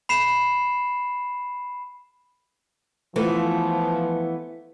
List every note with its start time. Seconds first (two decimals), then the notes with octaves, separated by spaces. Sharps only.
0.09 B5 C7 E7
3.16 E3 F3 A3 B3